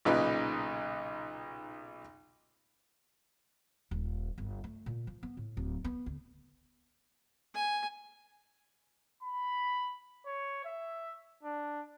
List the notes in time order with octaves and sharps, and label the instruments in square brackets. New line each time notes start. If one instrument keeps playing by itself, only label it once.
[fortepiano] B1 A#2 C#3 D#4 B4
[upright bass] D#1
G1
A3
A#2
F3
B3
A2
D1
B3
D2
[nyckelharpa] G#5
[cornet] B5
C#5
E5
D4